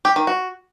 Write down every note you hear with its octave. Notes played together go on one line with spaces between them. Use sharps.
G4
D#3
F#4